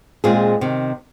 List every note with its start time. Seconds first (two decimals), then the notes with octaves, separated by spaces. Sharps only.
0.24 A#2 G#3 C4 F4 G#4
0.61 C3 D#3